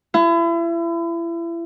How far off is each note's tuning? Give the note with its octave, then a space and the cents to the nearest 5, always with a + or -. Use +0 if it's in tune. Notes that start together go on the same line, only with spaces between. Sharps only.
E4 +35